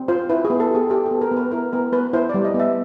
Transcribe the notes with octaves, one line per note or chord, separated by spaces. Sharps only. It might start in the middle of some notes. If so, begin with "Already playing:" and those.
Already playing: C4
F4 C5
E4 B4
G#4
B3
A4
G4 G#4
G4 A4
A4
B3
A#4
B3
B4
E4 A#4
B3 A#4
B3 B4
E4 C5
D5
G3
D#5
B3 E5